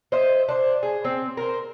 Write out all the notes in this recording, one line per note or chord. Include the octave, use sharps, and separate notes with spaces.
C5 D#5 E5
D4 C5
G#4
C4
A#4 C5